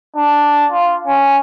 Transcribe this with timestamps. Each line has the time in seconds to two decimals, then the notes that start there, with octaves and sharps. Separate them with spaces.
0.16 D4
0.72 F4
1.07 C#4